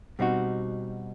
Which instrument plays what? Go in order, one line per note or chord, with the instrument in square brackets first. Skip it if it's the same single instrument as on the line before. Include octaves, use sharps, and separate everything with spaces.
[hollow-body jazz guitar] B2 G3 C4 D#4 F#4